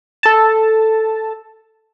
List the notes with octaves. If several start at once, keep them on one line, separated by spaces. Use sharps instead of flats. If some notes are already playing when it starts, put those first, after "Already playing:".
A4 A5